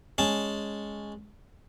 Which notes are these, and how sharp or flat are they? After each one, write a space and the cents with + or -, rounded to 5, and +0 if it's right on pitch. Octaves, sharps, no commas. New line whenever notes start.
G#3 +0 C#4 +0 A5 +0